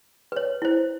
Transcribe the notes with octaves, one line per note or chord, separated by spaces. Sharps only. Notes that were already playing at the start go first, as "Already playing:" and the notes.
B4 C#5
E4 C5